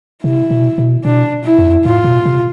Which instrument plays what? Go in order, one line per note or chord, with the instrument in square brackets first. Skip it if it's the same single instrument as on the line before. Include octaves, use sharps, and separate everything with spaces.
[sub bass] C3 [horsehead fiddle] E4
[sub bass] B2
B2
[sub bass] B2 [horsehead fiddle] D4
[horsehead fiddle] E4
[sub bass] F2
[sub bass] A2 [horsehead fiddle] F4
[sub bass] B2
C3